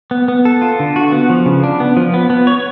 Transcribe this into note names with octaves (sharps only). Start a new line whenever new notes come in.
B3
B3
A4
F4
D3
F#4
B3
F3
C#3
D4
B3
F3
B3
B3
C#5